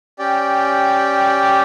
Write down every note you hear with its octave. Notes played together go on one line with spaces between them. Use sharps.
C#4 G4 D5 G5